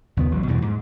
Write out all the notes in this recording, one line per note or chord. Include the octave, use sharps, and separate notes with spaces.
D#2 C#3 A3 B3
A1 F#3
E2 G2 B2 E3
G#2